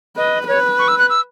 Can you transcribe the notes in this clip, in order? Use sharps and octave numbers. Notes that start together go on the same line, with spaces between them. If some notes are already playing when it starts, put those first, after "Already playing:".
B4 D#5
B4 C#5
C#6
E6
F#6
E6